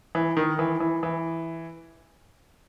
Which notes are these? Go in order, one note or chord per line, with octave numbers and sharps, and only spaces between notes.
E3
D#3
E3
E3
E3